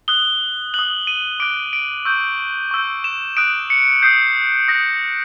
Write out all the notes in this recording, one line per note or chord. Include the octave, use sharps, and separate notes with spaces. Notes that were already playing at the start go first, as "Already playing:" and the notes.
D#6 F#6 G7
D#6 F#6 F#7
D#7
D6 F#6 D7
D7
C#6 E6 G6
C#6 E6 G6
E7
D#6 F#6 D7
C#7
D#6 G6 C7
D#6 F#6 A#6